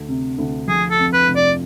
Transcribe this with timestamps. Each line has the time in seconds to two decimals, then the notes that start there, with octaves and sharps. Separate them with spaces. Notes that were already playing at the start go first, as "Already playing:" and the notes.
Already playing: D2
0.08 C3
0.38 D2
0.67 F3 G#4
0.90 A4
0.99 F2
1.13 B4
1.28 F1
1.36 D5